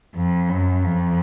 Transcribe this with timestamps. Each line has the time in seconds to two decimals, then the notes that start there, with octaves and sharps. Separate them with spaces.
0.16 F2
0.49 F#2
0.84 F2